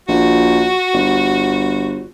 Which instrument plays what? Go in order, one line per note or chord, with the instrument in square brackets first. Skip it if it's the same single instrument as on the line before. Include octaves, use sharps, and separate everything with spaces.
[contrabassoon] A#1 [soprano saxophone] F#4
[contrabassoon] G1